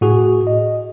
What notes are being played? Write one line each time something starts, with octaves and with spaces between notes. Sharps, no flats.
A2 F#4 G#4
D#5